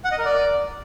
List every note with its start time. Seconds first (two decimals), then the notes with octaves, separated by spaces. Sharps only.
0.05 F#5
0.12 D#5
0.18 A#4
0.25 D5